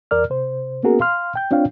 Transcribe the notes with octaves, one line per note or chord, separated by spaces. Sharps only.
E2 A#4 D5 F6
C3 C5
A#3 B3 C#4 F#4 G#4 A#4
F5 C6 F6
G5 G6
C4 D4 F4 C#5 F5 G5